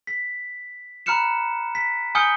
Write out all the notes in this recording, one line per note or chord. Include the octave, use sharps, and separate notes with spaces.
B6
A#5 B5 F6 F#6 C#7 E7
B6
G#5 D#6 F6 G6 C#7 G7